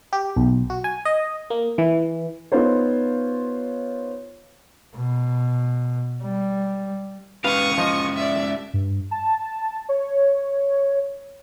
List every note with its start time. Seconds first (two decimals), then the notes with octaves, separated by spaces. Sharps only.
0.13 G4
0.36 B1
0.70 F#4
0.84 G#5
1.05 D#5
1.50 A#3
1.78 E3
2.52 B3 D#4 F4 C5 C#5
4.96 B2
6.23 G3
7.44 G#3 C#4 G4 B4 F5 C#6 D#6
7.78 F3 F4 D#5
8.16 D5 E5
8.73 G2
9.11 A5
9.89 C#5